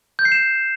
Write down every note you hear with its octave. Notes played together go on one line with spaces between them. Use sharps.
G6
C7
E7